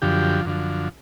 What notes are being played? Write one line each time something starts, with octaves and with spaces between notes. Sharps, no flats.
F#2 D3 F3 G4
F#2 D3 F3